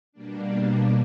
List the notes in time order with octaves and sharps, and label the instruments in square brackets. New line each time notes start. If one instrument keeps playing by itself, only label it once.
[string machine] B2 G3 A#3 D4